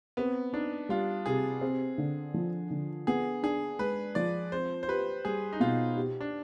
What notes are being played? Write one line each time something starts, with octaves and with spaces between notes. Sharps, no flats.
B3 C4
D4 D#4
G3 F4
C3 G#4
C4
D3
F3
D3
B3 G#4
D4 G#4
G#3 B4
F3 D5
C4 C5
C5
G4 B4
G3 G#4
D#4
B2 F4
G4
D4